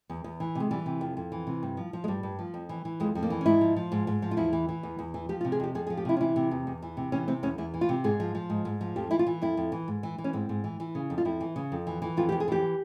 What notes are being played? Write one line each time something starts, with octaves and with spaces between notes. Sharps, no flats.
E2
E2
E3
C3 G#3
E3 G3
C3
F2
F2
E3
C3
G2
F3
F3
G#3
G2 G3
G2
F3
F2
E3
E3
F2 G#3
F2
A#3
E3
C#4
G#2 E4
F3
F3
G#2
G#2
F3
F4
E2 E4
E3
E3
E2
E2
E3
F3 G4
F4
C3
G#4
F2 G4
F2 G#4
G#4
F3
G4
C3 E4
C#4
E3 E4
C3
E2
E2
E3
C3
E3 C#4
C3 C4
E2 C#4
E2 E4
E3
F4
C3
G#2 G#4
F3
F3
G#2
G#2
F3
F2 G4
E3 E4
F4
E3
F2 E4
F2
E3
G#2
E3
E3
C#4
G#2 C4
G#2
E3
E3
C#3
F2
F4
F2 E4
E3
C#3
F2
E3
E3
F2 F4
G4
F2
G#4
E3 G4